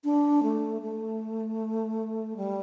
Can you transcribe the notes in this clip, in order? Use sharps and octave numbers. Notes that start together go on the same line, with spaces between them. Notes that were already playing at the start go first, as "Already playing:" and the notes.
D4
A3
A3
G3